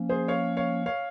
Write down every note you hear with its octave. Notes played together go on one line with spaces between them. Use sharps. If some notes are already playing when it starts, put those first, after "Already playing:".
Already playing: F3 A#3 C#4
G#4 C5
C#5 F5
C#5 F5
C#5 F5